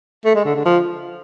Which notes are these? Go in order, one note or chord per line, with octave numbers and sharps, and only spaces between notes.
A3
G#3
D3
D3
F3